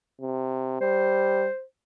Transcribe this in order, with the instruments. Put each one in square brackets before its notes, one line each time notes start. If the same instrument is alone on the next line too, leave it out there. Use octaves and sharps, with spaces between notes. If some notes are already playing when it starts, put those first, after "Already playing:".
[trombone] C3
[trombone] G3 [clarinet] C5